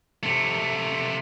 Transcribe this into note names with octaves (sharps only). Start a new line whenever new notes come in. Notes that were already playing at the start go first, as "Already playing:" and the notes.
C3 A3